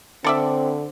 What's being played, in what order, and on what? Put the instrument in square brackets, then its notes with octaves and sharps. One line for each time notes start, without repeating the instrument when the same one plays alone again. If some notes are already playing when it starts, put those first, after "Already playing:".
[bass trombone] D3 [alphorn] C4 [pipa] A4 D5 E5